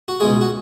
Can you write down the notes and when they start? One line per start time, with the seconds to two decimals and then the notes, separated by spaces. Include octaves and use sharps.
0.08 F#4
0.20 C#2 B2 G#3 G#4
0.41 F#4